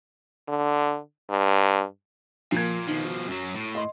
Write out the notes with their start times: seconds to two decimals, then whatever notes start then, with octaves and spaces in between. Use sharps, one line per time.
0.48 D3
1.30 G2
2.52 A#2 F3 A#3 G#6
2.88 B2 D#3 F3
3.04 F#4
3.28 F#2 F#3
3.55 A2
3.75 D#5 C6